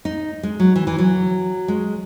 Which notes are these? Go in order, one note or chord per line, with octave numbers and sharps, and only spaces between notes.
D#4
G#3
F#3
E3
E3
F#3
G#3